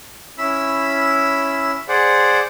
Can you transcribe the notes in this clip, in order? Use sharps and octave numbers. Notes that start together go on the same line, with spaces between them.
C#4 E4 B5 E6
G#4 C5 D5 F#5